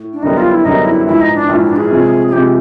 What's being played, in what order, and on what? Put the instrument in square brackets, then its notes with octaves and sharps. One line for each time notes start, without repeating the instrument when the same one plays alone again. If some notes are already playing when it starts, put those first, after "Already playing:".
Already playing: [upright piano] A2
[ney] D4
[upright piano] F#2 D3 G3 B3 [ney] D#4
[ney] F4
E4
[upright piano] F#2 D3 G3 B3 [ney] D#4
[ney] E4
[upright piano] A#1 G#2 E3 [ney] E4
[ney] D#4
D4
[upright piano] A#1 G#2 E3
[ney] D4
G#4
[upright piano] C3 F3 G#3
[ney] G#4
[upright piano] C3 F3 G#3 [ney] G4